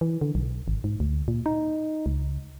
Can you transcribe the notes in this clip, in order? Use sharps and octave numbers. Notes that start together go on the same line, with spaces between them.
E3
D3
B1
G#1
G#2
D2
A#2
D#4
C#2